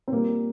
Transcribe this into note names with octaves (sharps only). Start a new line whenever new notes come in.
C4
A#2 G3 A#3